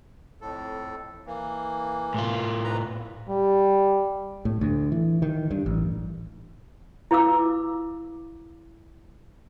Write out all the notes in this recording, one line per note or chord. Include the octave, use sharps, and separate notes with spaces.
F2 A2 A4
E3 A#3
A2 F4
G#2 B4 A#5
G3
A2
D2
E3
D#3
G2
A1
E4 B4 F5 D6 E6